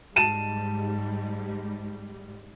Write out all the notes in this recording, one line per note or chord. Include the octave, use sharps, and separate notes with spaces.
G#2 G3 A5 D#7 E7